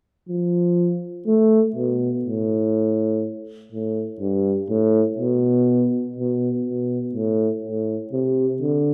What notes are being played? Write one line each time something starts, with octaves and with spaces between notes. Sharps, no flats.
F3
A3
B2
A2
A2
G2
A2
B2
B2
B2
A2
A2
C3
D3